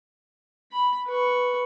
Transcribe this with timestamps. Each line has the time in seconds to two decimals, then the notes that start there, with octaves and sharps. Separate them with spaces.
0.72 B5
1.07 B4 C#6